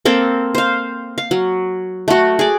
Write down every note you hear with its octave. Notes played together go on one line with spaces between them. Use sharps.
A#3 C4 A4
C5 F5
F5
F#3
A3 F#4
G#4 D5